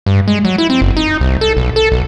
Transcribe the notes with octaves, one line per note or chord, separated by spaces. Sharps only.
G2
G#3
F#3
E4
C4
F#1
D#4
C2
A4
B1
A4
B1